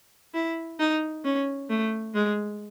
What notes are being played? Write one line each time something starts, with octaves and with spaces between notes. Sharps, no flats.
E4
D#4
C#4
A3
G#3